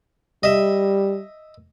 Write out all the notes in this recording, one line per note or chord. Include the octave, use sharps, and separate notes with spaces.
G3 D#5 E5